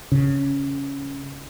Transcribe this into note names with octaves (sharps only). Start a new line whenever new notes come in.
C#3